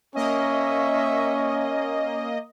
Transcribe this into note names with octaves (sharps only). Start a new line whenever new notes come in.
A#3 C#4 D#5 E5 C#6